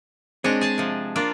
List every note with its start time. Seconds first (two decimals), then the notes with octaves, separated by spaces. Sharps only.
0.44 G#3 C4 D4 C#5 D#5
0.61 G#4 A5
0.78 C3 F3
1.16 A#3 D4 F4